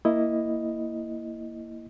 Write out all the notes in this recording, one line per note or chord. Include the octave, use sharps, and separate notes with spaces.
A#3 E4 D#5